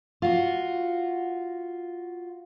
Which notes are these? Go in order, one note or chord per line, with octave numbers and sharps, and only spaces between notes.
F4 F#4